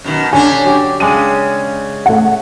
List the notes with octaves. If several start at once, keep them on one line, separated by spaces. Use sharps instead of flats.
F#2 B2 D#3
D3 G3 C#4 D4 G#5
F#3 G4
C#3 G#3 D4 G4 D#7
A3 F#5